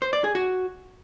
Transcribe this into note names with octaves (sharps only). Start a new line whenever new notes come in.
C5
D5
G#4
F#4